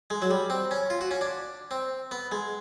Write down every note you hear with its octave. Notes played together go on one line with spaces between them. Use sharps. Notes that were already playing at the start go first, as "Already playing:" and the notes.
G#3
F#3
G3
C4
C#4
F4
F#4
C#4
D4
C4
B3
G#3